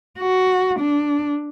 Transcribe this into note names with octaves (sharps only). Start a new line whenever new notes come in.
F#4
D4